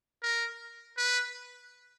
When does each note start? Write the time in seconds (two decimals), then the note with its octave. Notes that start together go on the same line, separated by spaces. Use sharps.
0.23 A#4
0.97 B4